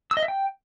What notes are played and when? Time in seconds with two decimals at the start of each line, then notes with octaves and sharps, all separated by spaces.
0.11 E6
0.17 D#5
0.23 E5
0.28 G5